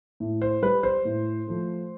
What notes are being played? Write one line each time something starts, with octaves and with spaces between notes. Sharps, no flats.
A2
C5
G3 B4
C5
A2
F3 A3